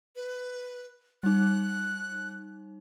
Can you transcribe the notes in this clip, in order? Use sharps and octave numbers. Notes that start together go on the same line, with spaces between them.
B4
G3 D#4 F#6